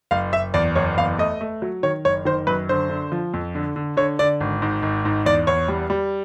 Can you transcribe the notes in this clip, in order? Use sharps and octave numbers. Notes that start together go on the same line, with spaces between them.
F#1 F5
F#1 E5
E2 D5
F#1 C#5
E2 F5
A3 D#5
A3
F#3
D#3 C#5
F#1 C#5
D#3 C5
F#2 B4
D3 C5
D3
F3
F2
D3
D3
D3 C#5
D3 D5
G#1
G#2
G#1
G#2
E2 D5
E2 C#5
G3
G3